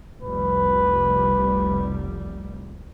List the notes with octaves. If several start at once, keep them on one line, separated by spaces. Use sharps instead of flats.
F1 C2 G3 B4